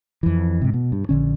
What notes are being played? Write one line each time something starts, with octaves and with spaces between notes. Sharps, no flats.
F2 E3
G#2 C3
B2
G2
A#1 D3 C#4